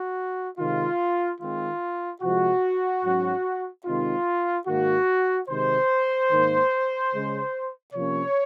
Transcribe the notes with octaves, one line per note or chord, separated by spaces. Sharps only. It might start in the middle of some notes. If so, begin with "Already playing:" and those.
Already playing: F#4
C3 D#3 G#3 F4
D#3 G#3 C4 F4
C3 F3 G#3 F#4
G#2 F#3 C#4
C3 D#3 G#3 C4 D#4 F4
G#2 D#3 A#3 F#4
C3 D#3 G#3 C5
G#2 D#3 A#3
C#3 G#3 C#4
C3 F3 A#3 C#4 C#5